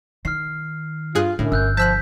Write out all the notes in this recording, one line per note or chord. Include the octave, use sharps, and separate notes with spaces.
D#3 F6 C7
G2 F4 G#4 F#6
F#2 A2 D3
G1 E6 F#6 G6
F3 A5 E6 F#6 G6 B6